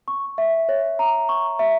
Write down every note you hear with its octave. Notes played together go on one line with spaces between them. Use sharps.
C#6
E5
C#5
A#5
C#6
E5